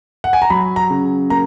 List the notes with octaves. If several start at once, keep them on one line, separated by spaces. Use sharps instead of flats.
F#5
G#5
A#5
F#3 B5
A#5
C#3
A#3 A#5